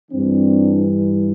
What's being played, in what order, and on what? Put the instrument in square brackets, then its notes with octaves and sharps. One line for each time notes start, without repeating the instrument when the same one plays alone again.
[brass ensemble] G2 E3 C4 D4